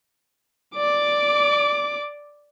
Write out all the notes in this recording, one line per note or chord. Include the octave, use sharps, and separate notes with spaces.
D5 D6